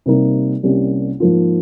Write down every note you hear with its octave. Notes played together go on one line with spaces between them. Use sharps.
C3 G3 A#3 D#4 A#4
C2 C3 G3 A#3 C#4
G#2 F3 A#3 F4